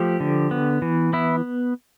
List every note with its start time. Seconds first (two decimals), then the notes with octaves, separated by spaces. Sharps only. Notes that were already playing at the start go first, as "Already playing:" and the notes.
Already playing: F3 A3 G4
0.20 D3
0.51 B3
0.82 E3
1.13 B3 E4